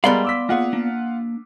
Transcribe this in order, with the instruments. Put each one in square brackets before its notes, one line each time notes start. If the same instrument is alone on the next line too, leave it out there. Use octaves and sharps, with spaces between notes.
[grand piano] G3 G#3 A#4 [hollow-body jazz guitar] B3 D5 F5 [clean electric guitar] B5 C6
[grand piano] D6 E6 B6
[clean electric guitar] A#3 G#4 [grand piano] F4 F#5
[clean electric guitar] A#3 D4